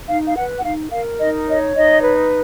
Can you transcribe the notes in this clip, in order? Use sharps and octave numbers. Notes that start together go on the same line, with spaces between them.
D#4 F5
F5
B4 F#5
F#5
D#4 F5
A#4 F5
D#4 D#5
C#5 D#5
D#4 D#5
B4